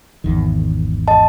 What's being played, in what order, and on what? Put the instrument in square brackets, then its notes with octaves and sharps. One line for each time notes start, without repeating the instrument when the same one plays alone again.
[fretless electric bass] G#1 E2 D#3
[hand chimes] D#5 A5